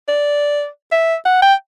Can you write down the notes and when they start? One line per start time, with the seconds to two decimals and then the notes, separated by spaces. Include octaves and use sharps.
0.08 D5
0.92 E5
1.26 F#5
1.42 G5